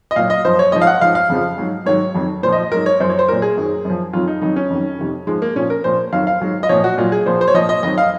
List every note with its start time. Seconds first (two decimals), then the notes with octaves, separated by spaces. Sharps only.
0.11 D#5
0.16 A#2 F#3 F5
0.30 D#5
0.45 F#2 F3 C5
0.59 C#5
0.72 G#2 F3 D#5
0.82 F5
0.87 F#5
1.01 G#2 F3 F5
1.15 F5
1.30 F2 C#3 F3
1.58 G#2 F#3
1.86 G#2 D#3 F#3 C#5
2.14 F2 D#3 F#3
2.43 A#2 C5
2.48 F3 D#5
2.62 D#5
2.72 G#2 F#3 A#4
2.86 C#5
3.00 F#2 F3 C5
3.10 C#5
3.19 C5
3.28 A#2 F#3 A#4
3.42 G#4
3.57 F#2 D#3 F#3
3.85 F#2 F3
4.13 F2 D#3 F#3 F4
4.27 D#4
4.42 F2 D#3 F#3 D#4
4.56 C#4
4.70 F2 D#3 F#3
4.98 F2 C3 D#3
5.27 G#2 F3 G#3
5.42 A#3
5.56 A#2 F3 C#4
5.70 A#4
5.84 A#2 F3 C5
6.12 F2 D#3 F#3 F5
6.27 F5
6.41 G#2 F#3
6.63 D#5
6.69 A#2 F3 C#5
6.84 F#4
6.98 A#2 F#3 F4
7.12 G#4
7.26 A#2 F3 C5
7.41 C5
7.48 C#5
7.54 A#2 F3 D#5
7.69 D#5
7.83 F2 D#3 F#3 D#5
7.98 F5